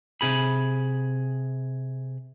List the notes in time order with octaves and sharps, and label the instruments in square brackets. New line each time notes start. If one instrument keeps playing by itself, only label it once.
[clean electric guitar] C3 G#4 B5